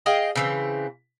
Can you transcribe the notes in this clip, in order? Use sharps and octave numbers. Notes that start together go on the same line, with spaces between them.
G#4 D#5 F5 G5
C#3 E3 C4